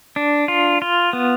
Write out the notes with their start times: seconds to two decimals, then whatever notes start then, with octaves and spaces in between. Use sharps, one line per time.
0.16 D4
0.48 F4
0.82 F4
1.13 B3